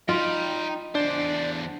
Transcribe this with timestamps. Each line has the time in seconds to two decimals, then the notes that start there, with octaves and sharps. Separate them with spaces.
0.09 D#4 F4 G5 B5
0.95 E2 D4 C5 D5